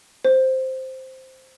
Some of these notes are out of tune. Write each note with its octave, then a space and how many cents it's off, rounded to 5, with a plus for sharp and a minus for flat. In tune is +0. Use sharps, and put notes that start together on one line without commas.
C5 +0